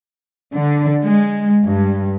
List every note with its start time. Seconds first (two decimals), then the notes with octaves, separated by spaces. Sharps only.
0.53 D3
1.04 G#3
1.64 G2